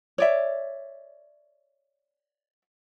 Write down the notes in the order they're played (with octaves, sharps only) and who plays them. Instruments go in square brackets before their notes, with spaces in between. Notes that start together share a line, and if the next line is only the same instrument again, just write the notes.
[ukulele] C#5 D5 E5